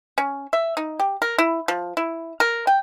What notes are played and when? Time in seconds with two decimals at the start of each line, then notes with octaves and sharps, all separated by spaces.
0.18 C#4
0.53 E5
0.77 D#4
1.00 G4
1.22 A#4
1.38 E4
1.68 F3
1.97 E4
2.40 A#4
2.67 G5